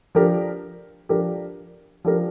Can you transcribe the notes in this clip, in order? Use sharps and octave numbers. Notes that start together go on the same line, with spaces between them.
F3 D4 G4 A#4
F3 D4 G4 A#4
F3 D4 G4 A#4